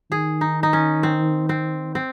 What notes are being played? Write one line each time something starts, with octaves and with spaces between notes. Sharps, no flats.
D#3 G#4
D#4
D#4
C#4
C4
C4
C4